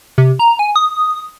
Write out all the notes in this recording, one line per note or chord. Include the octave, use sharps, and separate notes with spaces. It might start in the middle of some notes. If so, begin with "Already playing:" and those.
C3
A#5
G#5
D#6